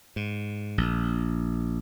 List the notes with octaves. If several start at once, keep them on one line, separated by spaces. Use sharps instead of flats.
G#2
A#1